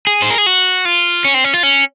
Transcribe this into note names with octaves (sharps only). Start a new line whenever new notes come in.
G#4
C5
A#4
G#4
F#4
F4
C#4
C4
C#4
F4
C#4